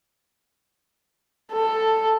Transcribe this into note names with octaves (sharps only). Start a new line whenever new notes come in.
A4